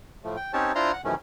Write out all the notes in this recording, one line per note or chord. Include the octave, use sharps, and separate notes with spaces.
A2 F3 A3
G5
C4 C#4 D#4 G4 C#5 A5
D4 E4 F4 C5 A#5 C6
F#5
F#2 C3 D#3 E3 A3 C#4